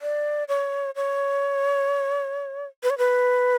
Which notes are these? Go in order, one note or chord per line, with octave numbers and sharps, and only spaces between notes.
D5
C#5
C#5
B4
C#5
B4